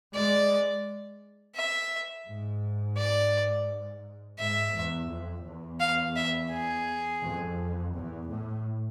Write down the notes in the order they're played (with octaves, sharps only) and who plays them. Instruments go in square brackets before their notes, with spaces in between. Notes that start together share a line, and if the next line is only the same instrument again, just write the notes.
[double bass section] G#3 [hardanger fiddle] D5
[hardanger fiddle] E5
[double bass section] G#2
[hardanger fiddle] D5
[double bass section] G#2 [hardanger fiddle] E5
[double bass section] E2
F2
E2
[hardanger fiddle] F5
E5
G#4
[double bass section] F2
E2
A2